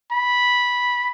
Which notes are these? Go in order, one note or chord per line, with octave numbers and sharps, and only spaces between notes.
B5